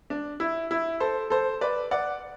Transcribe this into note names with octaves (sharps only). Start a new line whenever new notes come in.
D4
E4
E4
A4 C5
A4 C5
B4 D5
D5 F#5